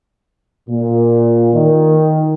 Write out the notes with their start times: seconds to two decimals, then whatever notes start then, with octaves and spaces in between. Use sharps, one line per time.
0.69 A#2
1.54 D#3